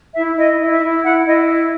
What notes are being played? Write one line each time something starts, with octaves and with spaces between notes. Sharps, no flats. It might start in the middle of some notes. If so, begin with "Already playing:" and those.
E4 E5
E4 D#5
E4
E5
E4
E4 F#5
E4 D#5